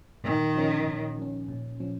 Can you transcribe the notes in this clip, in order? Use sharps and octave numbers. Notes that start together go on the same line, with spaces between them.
A#2 D#3
F3 C#4
A#2
F3 C#4
A#2
F3 C#4